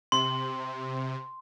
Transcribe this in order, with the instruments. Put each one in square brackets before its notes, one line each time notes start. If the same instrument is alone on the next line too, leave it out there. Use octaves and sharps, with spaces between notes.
[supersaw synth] C3 [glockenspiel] C6